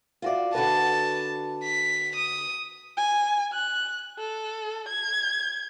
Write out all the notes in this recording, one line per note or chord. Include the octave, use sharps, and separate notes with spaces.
F4 F#4 D5
D3 F#4 B4 A5
B6
D#6
G#5
F#6
A4
G#6